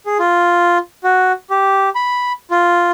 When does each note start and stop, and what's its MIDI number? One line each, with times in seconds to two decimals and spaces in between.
0.06 0.18 68
0.19 0.78 65
1.04 1.32 66
1.50 1.89 67
1.95 2.33 83
2.51 2.91 65